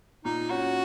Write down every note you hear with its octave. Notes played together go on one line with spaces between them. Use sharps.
A#2 D#4
C#4 F#4